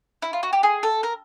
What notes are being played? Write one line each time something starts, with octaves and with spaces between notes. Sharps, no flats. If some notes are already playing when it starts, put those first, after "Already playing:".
E4
F4
F#4
G4
G#4
A4
A#4